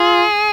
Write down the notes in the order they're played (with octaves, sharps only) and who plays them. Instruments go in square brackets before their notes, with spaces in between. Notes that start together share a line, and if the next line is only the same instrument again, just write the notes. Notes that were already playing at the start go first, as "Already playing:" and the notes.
Already playing: [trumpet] F4 [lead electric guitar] G#4